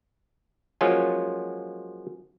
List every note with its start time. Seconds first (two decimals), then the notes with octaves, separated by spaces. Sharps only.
0.81 F3 F#3 G#3 A#3 C#4 F4